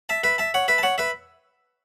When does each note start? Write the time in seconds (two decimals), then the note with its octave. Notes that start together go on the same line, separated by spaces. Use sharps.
0.09 E5 A5
0.24 B4 E5
0.38 E5 A5
0.54 C#5 F#5
0.68 B4 E5
0.78 A5
0.83 C#5 F#5
0.98 B4 E5